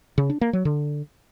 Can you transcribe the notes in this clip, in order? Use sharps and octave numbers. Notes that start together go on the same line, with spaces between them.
C#3
D4
A#3
F#3
D3